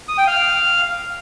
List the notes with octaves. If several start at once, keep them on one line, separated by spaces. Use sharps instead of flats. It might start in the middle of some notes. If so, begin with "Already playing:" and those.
D#6
G5
F5